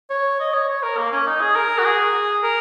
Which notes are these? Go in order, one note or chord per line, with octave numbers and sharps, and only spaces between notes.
C#5
D#5
C#5
C#5
A#4
A#3
C#4
D#4
G#4
A#4
F#4
G#4
A#4